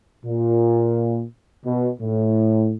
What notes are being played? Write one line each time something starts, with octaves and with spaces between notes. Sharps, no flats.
A#2
B2
A2